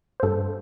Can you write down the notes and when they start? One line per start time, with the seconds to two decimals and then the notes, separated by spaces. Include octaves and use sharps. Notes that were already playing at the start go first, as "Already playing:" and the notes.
0.20 C5
0.23 G2 A4